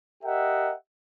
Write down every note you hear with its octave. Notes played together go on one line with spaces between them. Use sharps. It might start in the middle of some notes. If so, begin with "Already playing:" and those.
G4 A#4 D#5 E5 F#5 G5